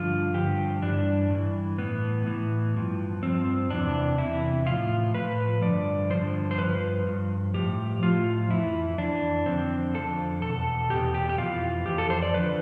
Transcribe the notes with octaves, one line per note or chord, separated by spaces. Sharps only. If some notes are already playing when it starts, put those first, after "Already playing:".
Already playing: G2 D3 F3 F4
G2 D3 F3 G4
G2 E3 D4
G2 E3
A2 E3 B3
A2 E3
G2 F3
G2 F3 C4
E2 C3 E3 D4
E2 C3 E3 E4
A2 F3 F4
A2 F3 B4
G2 D3 F3 D5
G2 D3 F3 C5
C5
G2 F3 B4
G2 F3
A2 F3 G4
A2 F3 F4
F2 E3 E4
F2 E3 D4
F2 D3 F3 C4
F2 D3 F3 A4
E2 B2 A4
E2 B2 G4
G4
G4
F2 E3 F4
F2 E3 G4
A4
C5
D5
F2 D3 F3 B4